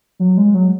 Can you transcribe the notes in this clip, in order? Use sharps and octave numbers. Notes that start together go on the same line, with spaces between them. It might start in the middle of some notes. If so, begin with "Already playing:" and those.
F#3
G#3
F#3